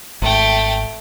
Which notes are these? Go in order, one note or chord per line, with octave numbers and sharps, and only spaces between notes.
G#1 A3 G5